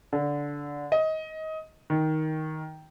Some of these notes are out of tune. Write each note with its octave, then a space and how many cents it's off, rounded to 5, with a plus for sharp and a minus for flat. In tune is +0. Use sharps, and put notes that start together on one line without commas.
D3 -15
D#5 +20
D#3 +10